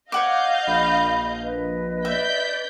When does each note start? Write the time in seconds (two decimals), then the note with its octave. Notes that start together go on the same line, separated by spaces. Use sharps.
0.12 C#5 D#5 F5 F#5 D6 G6
0.67 A#1 B5
1.43 B4 D#5
2.05 D5 E5 G6 B6